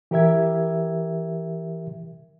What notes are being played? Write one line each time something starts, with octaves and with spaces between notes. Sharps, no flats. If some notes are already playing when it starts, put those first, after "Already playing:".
E3 G4 A#4 E5 G#6